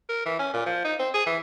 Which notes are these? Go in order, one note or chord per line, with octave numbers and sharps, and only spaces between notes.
A#4
E3
C#4
A#2
F3
D#4
C4
G#4
E3